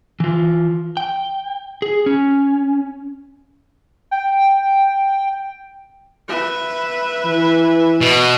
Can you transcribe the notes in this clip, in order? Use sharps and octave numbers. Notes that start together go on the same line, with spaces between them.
E3 F4
G5
G#4
C#4
G5
B4 E5
E3
B2